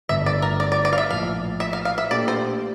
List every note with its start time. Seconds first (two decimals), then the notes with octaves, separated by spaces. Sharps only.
0.09 G1 G2 D3 A3 E5
0.26 D5
0.42 A#4
0.60 D5
0.72 D5
0.85 D5
0.93 F5
0.98 E5
1.10 A#1 A2 F3 F5
1.60 E5
1.73 F5
1.85 F5
1.98 E5
2.11 A#2 A3 D4 G4 D5
2.28 C5